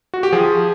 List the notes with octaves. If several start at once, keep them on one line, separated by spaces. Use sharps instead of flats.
F#4
G4
F3 G#4